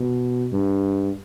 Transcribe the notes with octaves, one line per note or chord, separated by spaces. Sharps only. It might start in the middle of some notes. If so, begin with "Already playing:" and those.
Already playing: B2
G2